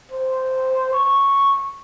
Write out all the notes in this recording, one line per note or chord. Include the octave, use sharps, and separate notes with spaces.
C5
C#6